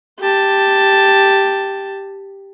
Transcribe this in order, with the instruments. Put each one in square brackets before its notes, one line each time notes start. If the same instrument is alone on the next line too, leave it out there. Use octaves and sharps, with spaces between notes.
[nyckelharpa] G4 A5